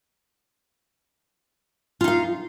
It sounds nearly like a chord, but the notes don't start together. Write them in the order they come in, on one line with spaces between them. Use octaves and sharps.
F4 D#4 F5